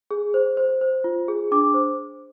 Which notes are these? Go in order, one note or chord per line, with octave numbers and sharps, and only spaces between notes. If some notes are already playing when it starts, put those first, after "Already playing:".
G#4
C5
C5
C5
F4
G#4
D4 D6
C5